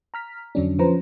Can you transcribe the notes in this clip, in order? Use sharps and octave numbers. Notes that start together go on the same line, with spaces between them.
A#5 F6 B6
F2 D3 F#3 C#4 D4
F3 C#4 B4 C5 A#5